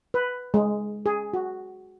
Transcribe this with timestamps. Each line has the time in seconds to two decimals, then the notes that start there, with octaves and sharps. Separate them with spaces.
0.14 B4
0.54 G#3
1.06 G#4
1.34 F#4